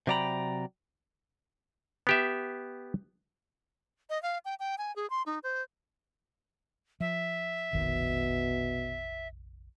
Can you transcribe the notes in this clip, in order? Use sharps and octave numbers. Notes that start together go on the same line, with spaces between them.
C3 F#3 D5 G5 A#5 B5
B3 G4 E5
D#5
F5
G5
G5
G#5
G#4
C6
D#4
C5
F3 E5
F1 A#1 B2 D#3